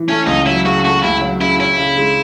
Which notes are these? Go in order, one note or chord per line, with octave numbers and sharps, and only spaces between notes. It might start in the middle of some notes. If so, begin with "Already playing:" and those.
Already playing: E3
A3 C#4
C#2 D#4
F#3 E4
C#3 F#4
A3 F#4
C#2 E4
F#3
C#3 E4
C#4 E4
C#3
G#3